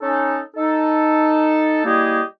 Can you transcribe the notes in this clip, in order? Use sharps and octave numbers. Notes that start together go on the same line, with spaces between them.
C#4 D#4 A4
D#4 A4
G3 A#3 E4 G4 G#4 D#5